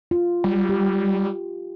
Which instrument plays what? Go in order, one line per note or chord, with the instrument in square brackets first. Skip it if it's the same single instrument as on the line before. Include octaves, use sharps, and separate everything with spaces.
[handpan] F4
[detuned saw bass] G3
[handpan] G4